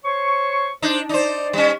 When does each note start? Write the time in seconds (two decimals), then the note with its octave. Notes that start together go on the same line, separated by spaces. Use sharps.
0.04 C5 C#5 C#6
0.82 D4 D#4 C5
1.09 D#4 C5 D5
1.53 G3 C#4